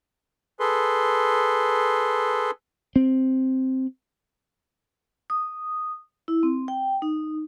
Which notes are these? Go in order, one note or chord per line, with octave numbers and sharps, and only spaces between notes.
G#4 A4 B4 C6
C4
D#6
E4
C4
G5
D#4